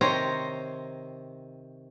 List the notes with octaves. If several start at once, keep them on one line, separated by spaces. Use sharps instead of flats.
C3 D#3 C4 C5 C#5 A#5